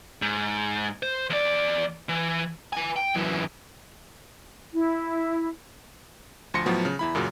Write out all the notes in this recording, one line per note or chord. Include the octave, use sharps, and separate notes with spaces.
G#2
C5
E2 D5
E3
B4 G#5
G5
F#2 E3
E4
D2 F3 C6 A#6 C#7
A2 F3 F#3 B3
C#3
E2 E4 B5
F#2 A#2 C#3 F#3